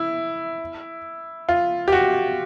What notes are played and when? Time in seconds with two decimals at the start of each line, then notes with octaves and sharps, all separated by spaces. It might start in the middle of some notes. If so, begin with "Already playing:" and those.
Already playing: E4
1.49 F4
1.88 G4
1.92 F#4